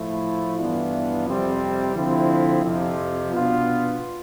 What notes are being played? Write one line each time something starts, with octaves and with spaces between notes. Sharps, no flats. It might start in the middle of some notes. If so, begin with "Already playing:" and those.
Already playing: A2 F3 A3 E4
G2 E3 B3 D4 F4
F2 C3 G3 C4
D3 F3 C4 E4
F2 C3 F3
B2 B3 D4 F4